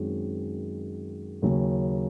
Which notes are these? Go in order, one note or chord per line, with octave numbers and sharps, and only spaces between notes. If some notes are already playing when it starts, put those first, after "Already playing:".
Already playing: F#2 D#3 G#3 C4 F#4
D#2 C#3 F#3 C#4